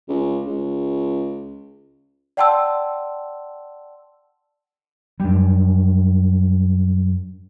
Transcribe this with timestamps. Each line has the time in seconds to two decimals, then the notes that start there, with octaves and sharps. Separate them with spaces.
0.08 C#2
0.47 C#2
2.37 D5 F#5 G5 A5 C6 E6
5.20 F#2 G3